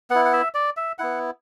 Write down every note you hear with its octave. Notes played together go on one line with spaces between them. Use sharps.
B3 E4 F#5
F#5
E5
D5
E5
B3 E4 F#5